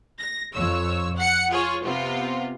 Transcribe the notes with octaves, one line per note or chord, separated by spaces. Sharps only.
A#6
F2 C#5 E6
F#5 F#6 C#7
F4 G#4 C#5
C3 B3 F4